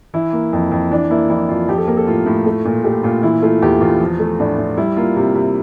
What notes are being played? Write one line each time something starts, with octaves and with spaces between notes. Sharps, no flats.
E3 E4
A#3
F2
F2
E3 D4
A#3 E4
F2 E4
F2 F4
F3 G4
A4
A#3 A#4
A4
A2 F4
A2
A3
A#2
A3 G4
A#2 F4
E3 E4
A3 F4
E2 G4
E2 F4
F3
A3
A2 D4
A2
G3 E4
A#3 F4
C3
C3